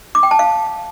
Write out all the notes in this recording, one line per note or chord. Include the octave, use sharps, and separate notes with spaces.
D6
G5
A5
F5